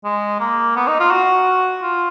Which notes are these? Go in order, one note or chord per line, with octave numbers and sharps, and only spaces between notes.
G#3
A#3
B3
D#4
F4
F#4
F4